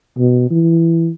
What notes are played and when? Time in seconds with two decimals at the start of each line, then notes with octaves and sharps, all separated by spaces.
0.18 B2
0.51 E3